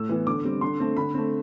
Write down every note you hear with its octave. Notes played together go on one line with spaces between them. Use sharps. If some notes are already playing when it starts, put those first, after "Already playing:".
Already playing: A2 E6
E3 B3
D3 D6
G3 C4
D3 C6
A3 C4
D3 B5
A3 C4